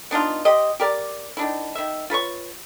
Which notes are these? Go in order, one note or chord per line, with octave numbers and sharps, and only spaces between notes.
B3 D4 D#4 F4
G4 C5 D#5
G4 A#4 D5
D#3 D4 E4
D#3 E5
F4 B4 C#5 C#6